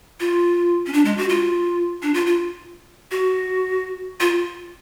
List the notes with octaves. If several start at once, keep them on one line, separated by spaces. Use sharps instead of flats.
F4
C#4
D4
G#3
F#4
F4
D4
F4
F4
F#4
F4